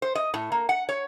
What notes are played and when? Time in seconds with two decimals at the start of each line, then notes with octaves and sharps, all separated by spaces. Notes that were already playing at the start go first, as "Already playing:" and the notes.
0.02 C5
0.15 D#5
0.34 A2
0.52 A#3
0.69 F#5
0.89 C#5